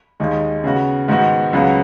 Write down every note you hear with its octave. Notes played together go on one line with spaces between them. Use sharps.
D#2 D#3 G#3 D#4
C#3 B3 F#4
G#2 D#3 G#3 B3 F#4
C#2 C#3 F#3 B3